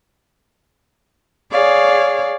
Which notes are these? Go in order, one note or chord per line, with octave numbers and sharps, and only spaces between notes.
G#4 C#5 D5 F5